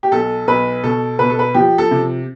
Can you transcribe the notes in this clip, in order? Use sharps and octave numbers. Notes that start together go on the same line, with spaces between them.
G4
B1 A4
B1 B4
B2 A4
B2 B4
A4
B4
F3 G4
A4
C3